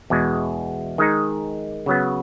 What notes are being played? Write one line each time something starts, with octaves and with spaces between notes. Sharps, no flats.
E2 B2 G#3
D#3 G#3 D#4
C#3 F#3 B3